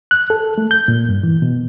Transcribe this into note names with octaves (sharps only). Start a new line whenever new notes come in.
F#6
A4
A3
G6
A#2
G2
E3
B2